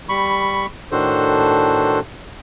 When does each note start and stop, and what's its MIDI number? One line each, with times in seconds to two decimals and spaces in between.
0.09 0.66 55
0.09 0.66 83
0.09 0.66 85
0.92 1.99 45
0.92 1.99 51
0.92 1.99 62
0.92 1.99 66
0.92 1.99 69
0.92 1.99 72